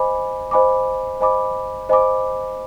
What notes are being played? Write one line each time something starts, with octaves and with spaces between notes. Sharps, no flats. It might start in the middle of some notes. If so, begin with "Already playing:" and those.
Already playing: C5 D#5 G#5 B5 D6
C5 D#5 G#5 B5 D6
C5 D#5 G#5 B5 D6
C5 D#5 G#5 B5 D6